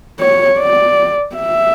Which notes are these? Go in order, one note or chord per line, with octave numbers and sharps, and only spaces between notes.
C#5
D5
E5